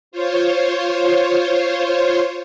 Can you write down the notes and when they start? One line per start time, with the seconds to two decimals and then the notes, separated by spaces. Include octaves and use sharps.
0.12 F4 C5 C#5